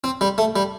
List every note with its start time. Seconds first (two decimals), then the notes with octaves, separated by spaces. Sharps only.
0.04 C4
0.21 G3
0.38 A3
0.56 G3